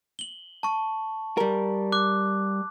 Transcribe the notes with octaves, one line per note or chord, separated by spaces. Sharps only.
F#7 G7
A5 C#6
G3 A#4
D6 F#6